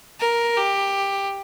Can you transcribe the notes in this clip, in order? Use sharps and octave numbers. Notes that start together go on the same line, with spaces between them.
A#4
G4